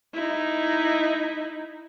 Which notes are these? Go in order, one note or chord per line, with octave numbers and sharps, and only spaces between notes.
D#4 E4